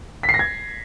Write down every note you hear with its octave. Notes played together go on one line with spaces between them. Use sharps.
B6
C7
A#6
G#6